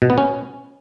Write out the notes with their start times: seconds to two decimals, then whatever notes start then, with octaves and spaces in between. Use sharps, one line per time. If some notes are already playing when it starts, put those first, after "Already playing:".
0.02 B2
0.10 B3
0.18 C#4